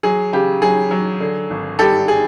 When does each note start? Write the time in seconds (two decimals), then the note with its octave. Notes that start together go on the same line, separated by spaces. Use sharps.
0.03 F#3 G#4
0.33 C#3 G4
0.62 F#3 G#4
0.91 F#3
1.20 D3
1.50 G#1
1.79 G2 G4 A4
2.08 G#4